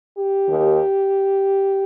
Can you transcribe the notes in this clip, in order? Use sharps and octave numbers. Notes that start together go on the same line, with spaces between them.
G4
D#2 D#3